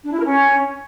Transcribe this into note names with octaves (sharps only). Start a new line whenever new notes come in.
D4
E4
A#4
C#4